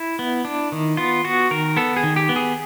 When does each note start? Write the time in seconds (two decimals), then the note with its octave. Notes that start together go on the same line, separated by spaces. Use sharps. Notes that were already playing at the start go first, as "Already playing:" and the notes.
Already playing: E4
0.19 B3
0.45 D4
0.72 D#3
0.97 B3 F4
1.24 B3 F#4
1.51 D#3 A#4
1.76 B3 A4
1.97 G#4
2.03 D#3
2.16 G4
2.29 B3
2.36 G#4